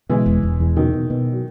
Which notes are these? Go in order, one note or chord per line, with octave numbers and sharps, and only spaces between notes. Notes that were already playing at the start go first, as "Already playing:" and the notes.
B2 E3 G#3
E1
E1
E2
B2 D#3 F#3
B2
B2
F#3